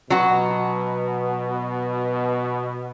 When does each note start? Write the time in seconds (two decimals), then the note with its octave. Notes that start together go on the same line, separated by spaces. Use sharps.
0.10 B2 F#3 F#4